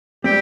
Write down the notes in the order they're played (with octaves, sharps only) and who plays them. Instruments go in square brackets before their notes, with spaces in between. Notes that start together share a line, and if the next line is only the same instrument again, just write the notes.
[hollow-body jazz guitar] G3 C4 [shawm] G4